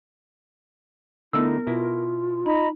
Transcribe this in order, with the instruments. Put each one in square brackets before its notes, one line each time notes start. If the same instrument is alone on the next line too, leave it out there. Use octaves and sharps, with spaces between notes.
[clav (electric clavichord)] D3 A3 D#4 [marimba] B3 E6 [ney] E4 [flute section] A#4
[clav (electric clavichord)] B2 E4 [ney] F4
[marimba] D#4 [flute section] D#5 A#5 B5